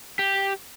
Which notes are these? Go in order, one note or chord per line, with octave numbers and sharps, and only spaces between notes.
G4